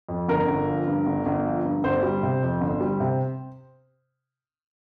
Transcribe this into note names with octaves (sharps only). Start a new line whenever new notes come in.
F2
G1 A#4
G1
F3
G2
G1
G1
F3
G2
G1 C5
G3
C3
F2
G1
G3
C3